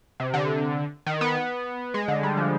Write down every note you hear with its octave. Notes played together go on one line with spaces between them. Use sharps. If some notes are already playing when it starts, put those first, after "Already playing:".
C3
D3
D#3
B3
G#3
D3
G3
F3